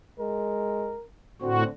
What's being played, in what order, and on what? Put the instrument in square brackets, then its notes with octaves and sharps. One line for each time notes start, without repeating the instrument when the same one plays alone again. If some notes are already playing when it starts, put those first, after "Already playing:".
[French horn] G#3 [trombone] A#4
[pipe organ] A2 F#4 [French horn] D3 [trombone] C4